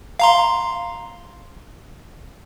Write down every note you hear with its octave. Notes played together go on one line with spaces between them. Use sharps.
F5 A#5 C6